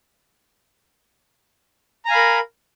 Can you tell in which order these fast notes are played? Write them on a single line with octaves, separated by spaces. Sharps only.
A#5 G#5 F5 B5 A#4